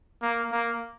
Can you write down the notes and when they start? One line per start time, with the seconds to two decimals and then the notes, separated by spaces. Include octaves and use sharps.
0.22 A#3
0.52 A#3